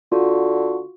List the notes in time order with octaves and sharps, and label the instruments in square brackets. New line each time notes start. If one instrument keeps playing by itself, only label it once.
[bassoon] D3 [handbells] F4 F#4